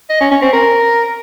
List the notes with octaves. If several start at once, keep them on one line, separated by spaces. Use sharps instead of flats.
D#5
C#4
C#4
C4
A#4